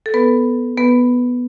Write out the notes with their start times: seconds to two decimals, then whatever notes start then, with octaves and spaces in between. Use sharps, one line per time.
0.06 A4
0.14 B3 B4
0.77 B3 B4